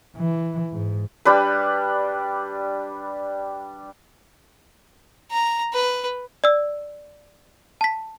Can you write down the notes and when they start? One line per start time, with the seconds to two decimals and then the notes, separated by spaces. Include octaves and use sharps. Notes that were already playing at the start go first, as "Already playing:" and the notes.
0.16 E3
0.73 G#2
1.25 G3 D4 B4
5.31 A#5
5.73 B4
6.44 D5 E6
7.81 A5 B6